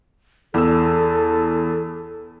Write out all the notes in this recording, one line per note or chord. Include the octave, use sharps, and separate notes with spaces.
E2 A4 E6